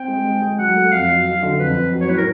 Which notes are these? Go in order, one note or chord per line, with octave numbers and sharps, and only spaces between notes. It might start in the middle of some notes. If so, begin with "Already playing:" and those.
Already playing: C4 G5
G#3
G#3
G#3
F#3 F#5
A3
F2 F5
F#3
F#3
D3
F2 B4
F2
F#3
C#5
A2 B4
A#4